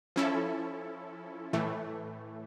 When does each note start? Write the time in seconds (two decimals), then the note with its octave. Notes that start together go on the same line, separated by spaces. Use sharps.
0.16 F3 C#4 E4 A4
1.53 A2 E3 A3